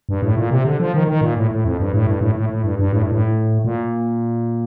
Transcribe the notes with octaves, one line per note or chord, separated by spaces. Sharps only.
G2
A2
A#2
C3
D3
F3
D#3
D#3
A#2
A2
A2
F2
G2
A2
G2
A2
A2
A2
G2
G2
A2
G2
A2
A#2